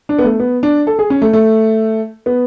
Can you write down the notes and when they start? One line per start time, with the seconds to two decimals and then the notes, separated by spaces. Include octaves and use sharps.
0.09 D4
0.19 B3
0.24 A3
0.40 B3
0.63 D4
0.87 A4
0.99 G#4
1.10 C#4
1.22 A3
1.33 A3
2.26 B3